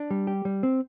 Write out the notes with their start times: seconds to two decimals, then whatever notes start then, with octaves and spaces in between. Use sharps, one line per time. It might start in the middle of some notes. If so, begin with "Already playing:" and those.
Already playing: D4
0.11 G3
0.27 G4
0.45 G3
0.63 C4